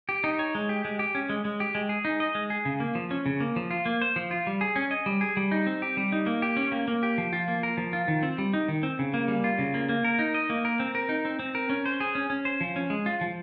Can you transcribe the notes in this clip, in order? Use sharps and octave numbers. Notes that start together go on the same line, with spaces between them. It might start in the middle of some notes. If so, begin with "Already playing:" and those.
G4
D#4
C#5
G#3
G4
G#3
G4
C#4
G#3
G#3
G4
G#3
G#4
D#4
D#5
G#3
G#4
C#3
A#3
F3
C#4
C#3
A#3
F3
F4
A#3
C5
F3
F4
G3
G#4
C#4
D#5
G3
G#4
G3
D#4
C4
G4
G3
D#4
A#3
G4
C#4
A#3
A#3
G4
F3
F4
A#3
A#4
F3
F4
D#3
C4
G3
D#4
D#3
C4
C#3
A#3
G3
F4
C#3
A#3
A#3
A#4
D#4
D#5
A#3
A#4
C4
A#4
D#4
C4
C4
A#4
C#4
C5
G#4
C#4
C#4
C5
F3
C#4
G#3
F4
F3